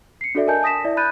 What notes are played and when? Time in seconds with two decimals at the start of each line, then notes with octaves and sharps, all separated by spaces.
0.21 C7 C#7
0.35 D4 F#4 A4 D5 E5
0.47 A#4 D#5 G#5 A5 G6
0.63 A5 D#6 A#6 B6 E7
0.85 E4 D5 E5
0.97 B5 F#6 G6 A6 D#7